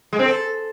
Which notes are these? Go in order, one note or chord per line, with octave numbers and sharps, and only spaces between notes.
G#3
C4
A4